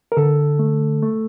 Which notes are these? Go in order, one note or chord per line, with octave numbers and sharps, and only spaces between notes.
A#4
D3 A4
A3
A3